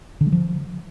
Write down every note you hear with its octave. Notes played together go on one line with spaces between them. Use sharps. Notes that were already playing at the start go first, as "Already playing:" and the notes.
D3
G3
F3